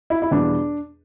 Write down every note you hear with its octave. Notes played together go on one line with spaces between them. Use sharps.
E4
E4
E2 B2 G3 D4